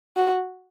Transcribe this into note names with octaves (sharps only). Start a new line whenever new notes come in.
F#4